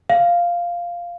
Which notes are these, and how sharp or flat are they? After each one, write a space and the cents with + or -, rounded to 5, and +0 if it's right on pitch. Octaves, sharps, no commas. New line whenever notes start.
F5 -5